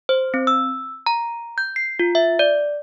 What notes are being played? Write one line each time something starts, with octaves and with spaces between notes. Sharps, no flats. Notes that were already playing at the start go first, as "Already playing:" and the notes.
C5
C4
E6
A#5
G6
C7
F4
E5
D5